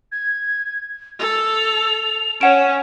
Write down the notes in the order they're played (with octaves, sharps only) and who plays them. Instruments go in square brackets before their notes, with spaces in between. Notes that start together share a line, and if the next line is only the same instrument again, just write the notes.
[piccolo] G#6
[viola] A4 [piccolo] F7
[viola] C#4 [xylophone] C#5 F#5 D7 [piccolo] E7